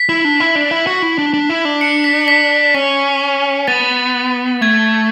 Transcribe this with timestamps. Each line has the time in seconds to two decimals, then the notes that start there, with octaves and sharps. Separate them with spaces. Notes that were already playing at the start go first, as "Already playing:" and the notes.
Already playing: B6
0.09 E4
0.24 D4
0.40 E4
0.55 D4
0.71 E4
0.87 F#4
1.02 E4
1.18 D4
1.34 D4
1.49 E4
1.65 D4
1.81 C#7
2.04 B6
2.28 B6
2.74 C#4 B6
3.68 B3 A6
4.61 A3 G#6